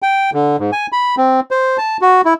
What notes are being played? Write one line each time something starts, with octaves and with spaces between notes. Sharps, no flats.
G5
D3
G#2
G#5
B5
C4
C5
A5
F#4
E4